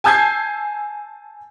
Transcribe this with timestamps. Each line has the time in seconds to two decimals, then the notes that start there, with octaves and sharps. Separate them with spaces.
0.04 G#5 A5 E6 G6 G#6 C7